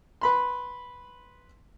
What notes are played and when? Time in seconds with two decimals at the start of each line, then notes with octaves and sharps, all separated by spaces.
0.21 B4 B5 C6